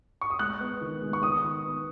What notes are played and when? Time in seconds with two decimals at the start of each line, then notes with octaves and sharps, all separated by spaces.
0.21 C#6
0.30 D#6
0.39 G#3 F#6
0.60 B3
0.81 D#3
1.02 G#3
1.13 C#6
1.23 D#3 D#6
1.44 D#3
1.65 B3